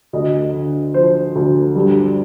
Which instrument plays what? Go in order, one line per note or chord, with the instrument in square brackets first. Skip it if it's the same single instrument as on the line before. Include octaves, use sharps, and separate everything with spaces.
[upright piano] D2 D#5
D3
F3 C5
D2
G2